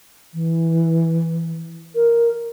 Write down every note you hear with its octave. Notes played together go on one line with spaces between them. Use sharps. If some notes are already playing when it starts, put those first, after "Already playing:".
E3
A#4